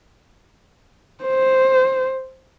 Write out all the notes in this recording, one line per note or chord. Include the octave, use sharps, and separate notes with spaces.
C5